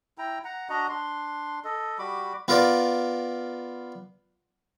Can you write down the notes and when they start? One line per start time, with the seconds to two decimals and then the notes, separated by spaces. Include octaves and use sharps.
0.18 E4 G5 A#5
0.44 F#5 A#5
0.69 D4 F#4 D#5 A#5
0.89 D4 C6
1.65 A4 D#5
1.98 G3 F#4 B5 D6
2.48 B3 F4 A#4 B4 D5